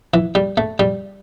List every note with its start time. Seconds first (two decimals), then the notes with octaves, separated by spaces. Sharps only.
0.14 E3
0.35 G3
0.57 A3
0.79 G3